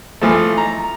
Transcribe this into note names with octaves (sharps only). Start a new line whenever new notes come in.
E3 F3 A3
A#5